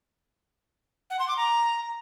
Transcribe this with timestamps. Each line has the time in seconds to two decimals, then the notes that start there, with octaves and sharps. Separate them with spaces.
1.10 F#5
1.19 C6
1.28 D6
1.37 A#5